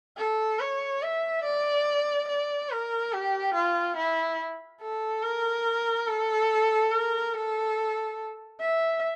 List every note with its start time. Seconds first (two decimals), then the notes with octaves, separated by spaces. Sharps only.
0.18 A4
0.60 C#5
1.02 E5
1.44 D5
2.29 D5
2.70 A#4
3.13 G4
3.55 F4
3.97 E4
4.82 A4
5.23 A#4
6.07 A4
6.92 A#4
7.34 A4
8.60 E5